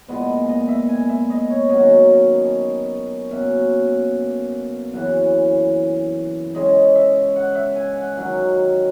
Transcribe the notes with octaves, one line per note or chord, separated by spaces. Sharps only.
A#2 G#3 B3 D#5
D#5
E5
G#5
E5
D#5
C#5
D#3 F#3 C#4 D#5
B2 A#3 C#4 E5
F#2 C#3 E3 F#5
C#3 G#3 C#4 D#5
E5
F#5
E5
G#5
F#5
D#3 F#3 C#4 F#5